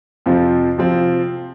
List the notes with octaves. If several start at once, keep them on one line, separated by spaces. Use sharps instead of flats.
F2 C3 F3 C4 F4
C3 F3 C4 F4